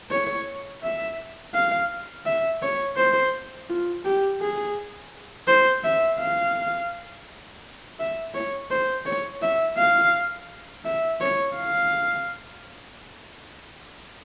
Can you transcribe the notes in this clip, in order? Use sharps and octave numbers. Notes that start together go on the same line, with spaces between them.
C#5
E5
F5
E5
C#5
C5
F4
G4
G#4
C5
E5
F5
E5
C#5
C5
C#5
E5
F5
E5
C#5
F5